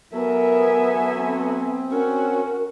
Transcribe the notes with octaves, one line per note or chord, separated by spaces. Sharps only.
F#3 B3 A4 A#4 E5 G#5
C4
C#4 F#4 A#4